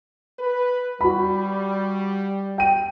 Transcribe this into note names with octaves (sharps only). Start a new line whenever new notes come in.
B4
G3 F#4 B5
G5 D#7